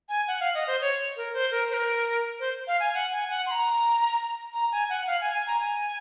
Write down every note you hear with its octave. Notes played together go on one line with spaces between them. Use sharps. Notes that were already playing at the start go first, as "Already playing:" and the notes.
G#5
F#5
F5
D#5
C5
C#5
A#4
C5
A#4
C5
A#4
C5
F5
G#5
F#5
G#5
F#5
C6
A#5
A#5
G#5
F#5
F5
G#5
G#5
A#5
G#5